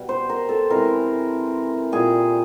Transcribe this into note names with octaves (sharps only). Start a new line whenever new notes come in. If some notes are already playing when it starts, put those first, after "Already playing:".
Already playing: B2 G3
C5
A#4
A4
C3 E3 G#3 A#4
A#2 G3 G#4